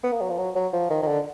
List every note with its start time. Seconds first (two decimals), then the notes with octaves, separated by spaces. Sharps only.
0.04 B3
0.12 A#3
0.21 F#3
0.30 F3
0.38 F#3
0.56 F#3
0.73 F3
0.90 D#3
1.03 D#3
1.07 D3